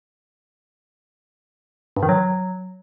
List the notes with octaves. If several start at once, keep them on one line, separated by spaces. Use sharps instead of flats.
G2
D#3
F#3